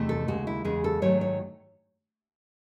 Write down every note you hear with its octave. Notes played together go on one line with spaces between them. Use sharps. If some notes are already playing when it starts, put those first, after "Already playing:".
Already playing: E2 C3 D#3 A3
A4
D#2 C#3 G#3 F#4
E4
E2 C#3 G#3 G#4
A4
G#2 D#3 F#3 A3 C#5
C#5